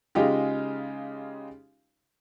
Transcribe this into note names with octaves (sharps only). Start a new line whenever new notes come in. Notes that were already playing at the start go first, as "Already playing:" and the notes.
C#3 G#3 D#4 F4 G4